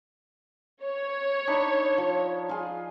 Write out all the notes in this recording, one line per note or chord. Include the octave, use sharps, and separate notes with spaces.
C#5
D4 D#4 B5
F3
F4 G#4